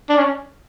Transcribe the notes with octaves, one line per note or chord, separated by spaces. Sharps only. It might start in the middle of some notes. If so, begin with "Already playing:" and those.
D4
C#4